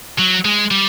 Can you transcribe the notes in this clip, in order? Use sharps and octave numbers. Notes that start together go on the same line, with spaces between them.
F#3
G#3
G3